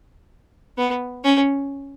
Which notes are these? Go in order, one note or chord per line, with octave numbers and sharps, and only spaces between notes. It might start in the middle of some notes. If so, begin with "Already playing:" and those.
B3
C#4